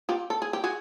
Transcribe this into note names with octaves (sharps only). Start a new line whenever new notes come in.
F4 G4
A4
G#4
G4
F#4 G#4